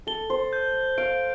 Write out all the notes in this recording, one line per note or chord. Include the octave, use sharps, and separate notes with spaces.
A4 G7
C5
G6
F5 D7